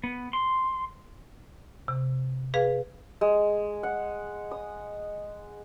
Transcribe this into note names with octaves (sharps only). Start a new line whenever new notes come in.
B3
C6
C3
G#4 B4 F5
G#3
F#5
D#6